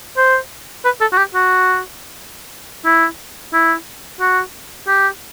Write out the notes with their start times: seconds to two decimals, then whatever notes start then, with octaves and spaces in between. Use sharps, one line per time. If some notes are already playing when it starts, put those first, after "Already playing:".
0.17 C5
0.85 B4
1.01 A4
1.12 F#4
1.18 G4
1.35 F#4
2.85 E4
3.53 E4
4.20 F#4
4.88 G4